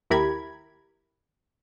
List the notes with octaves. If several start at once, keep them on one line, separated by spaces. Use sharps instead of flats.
D#2 E4 G4 A#4 B5 G#6